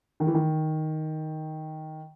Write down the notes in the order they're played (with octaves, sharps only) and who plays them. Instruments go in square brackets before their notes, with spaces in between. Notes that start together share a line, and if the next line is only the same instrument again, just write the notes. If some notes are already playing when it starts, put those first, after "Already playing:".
[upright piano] D#3
E3
D#3